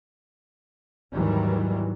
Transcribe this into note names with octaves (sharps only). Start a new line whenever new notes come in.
D#2 G#2 D#3 E3 F#3 G3